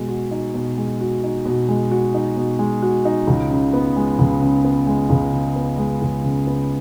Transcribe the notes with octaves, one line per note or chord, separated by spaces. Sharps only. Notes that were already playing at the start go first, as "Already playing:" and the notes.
Already playing: B2 G#3
F#4
D#4
B2
G#3
F#4
D#4
B2
G#3
F#4
D#4
B2
G#3
F#4
D#4
C#2
C#3
B3
G#3
C#2
C#3
B3
G#3
C#2
C#3
B3
G#3
C#2
C#3
B3